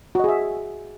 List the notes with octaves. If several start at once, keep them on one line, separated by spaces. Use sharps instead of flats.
F#4 G#4 D#5 E5